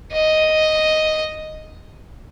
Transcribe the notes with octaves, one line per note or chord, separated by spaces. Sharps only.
D#5